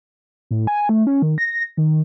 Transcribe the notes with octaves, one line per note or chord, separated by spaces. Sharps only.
A2
G#5
A3
C#4
D#3
A#6
D#3